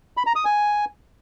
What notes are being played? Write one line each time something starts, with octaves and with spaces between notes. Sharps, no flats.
B5
A#5
D#6
G#5